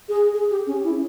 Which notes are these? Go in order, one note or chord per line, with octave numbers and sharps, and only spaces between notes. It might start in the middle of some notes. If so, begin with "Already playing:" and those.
G#4
G#4
G4
C#4
E4